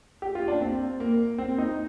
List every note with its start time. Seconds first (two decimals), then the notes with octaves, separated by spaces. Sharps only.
0.22 G4
0.35 F4
0.48 D4
0.61 C4
1.00 A#3
1.38 C4
1.58 D#4